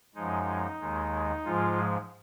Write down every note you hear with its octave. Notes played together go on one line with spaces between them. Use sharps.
F#2 F3 G#3 D#4
D#2 D#3 G#3
G#2 F3 G#3 F4